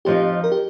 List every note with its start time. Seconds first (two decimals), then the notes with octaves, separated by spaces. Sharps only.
0.05 F2 F3 D#4 G4
0.44 A#4
0.52 G4